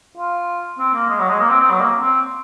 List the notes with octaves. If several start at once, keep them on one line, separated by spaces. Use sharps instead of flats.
F4
C4
A#3
G#3
F#3
G#3
A#3
C4
C4
F#3
A#3
C4